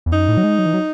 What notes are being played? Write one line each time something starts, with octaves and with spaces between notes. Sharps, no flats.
E2
F#2 D#4
A2
F#3
G#3
F#3
E3
F#3